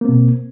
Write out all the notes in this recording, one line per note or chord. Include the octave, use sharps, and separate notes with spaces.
B2 A#3 C4